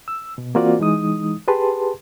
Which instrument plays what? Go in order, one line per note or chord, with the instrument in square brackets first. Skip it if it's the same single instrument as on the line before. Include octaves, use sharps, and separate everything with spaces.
[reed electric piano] E6
B2
E3 A#3 C4 F4 F#4 D5
E3 G#3 D#4 D#6
G4 G#4 B4 A5 C6